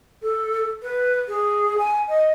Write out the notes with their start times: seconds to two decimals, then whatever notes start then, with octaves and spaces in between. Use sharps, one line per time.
0.22 A4
0.83 B4
1.28 G#4
1.78 G#5
2.09 D#5